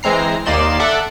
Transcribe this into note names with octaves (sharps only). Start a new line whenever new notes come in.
E3 G#3 C4 A#5 C7
D#2 A#3 D#4 D5 C6 E7
A4 D5 E5 F#5